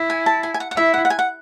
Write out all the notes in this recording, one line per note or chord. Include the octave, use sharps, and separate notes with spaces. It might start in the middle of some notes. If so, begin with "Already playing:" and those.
Already playing: E4
G#5
A5
G#5
G#5
F#5
F#5
E4 E5
F#5
F#5
G#5
F#5